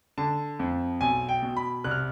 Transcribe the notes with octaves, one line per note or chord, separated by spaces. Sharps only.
D3 A5
F2
B1 G#5
G5
B2
B5
C2 F#6
F6